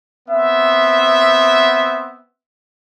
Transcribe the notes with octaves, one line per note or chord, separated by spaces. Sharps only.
B3 C4 E5